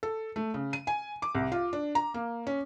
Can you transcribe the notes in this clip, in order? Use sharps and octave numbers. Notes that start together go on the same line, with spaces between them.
A4
A3
C#3
D#7
G#5
D6
C2
F4
D4
A#5
A#3
C#4